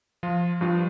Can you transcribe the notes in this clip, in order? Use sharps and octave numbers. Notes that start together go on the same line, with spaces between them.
F3 F4
G2 F3 F4